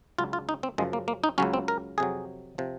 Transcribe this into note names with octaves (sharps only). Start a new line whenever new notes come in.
C#2 C#3 F#3 F4
F4
D#4
C4
F#2 C#3 F3 G#3
A#3
A#3
D#4
C#2 C#3 F#3 C#4
C4
A#4
F2 C3 F#3 G#4
C3 F3